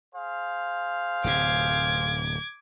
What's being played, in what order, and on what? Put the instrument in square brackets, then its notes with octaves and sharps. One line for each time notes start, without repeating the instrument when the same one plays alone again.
[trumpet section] G#4 C5 F5
[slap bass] D1 C3 [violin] D6 G#6